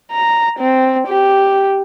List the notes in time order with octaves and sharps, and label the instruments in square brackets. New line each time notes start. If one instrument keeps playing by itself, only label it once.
[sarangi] A#5
C4
G4